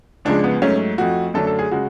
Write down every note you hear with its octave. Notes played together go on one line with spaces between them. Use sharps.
C#2 C#3 F3 G#3 D4
B3
G#2 F#3 A3 C#4
F2 F3 A3 F#4
F#2 D3 F#3 A3 A4
A4
G#4
C#3 G#3 F#4